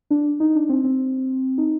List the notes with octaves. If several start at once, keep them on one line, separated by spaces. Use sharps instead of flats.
D4
D#4
D4
C4
C4
D#4